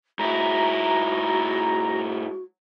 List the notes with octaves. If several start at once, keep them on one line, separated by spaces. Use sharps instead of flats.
G#2 E4 F#4 A#5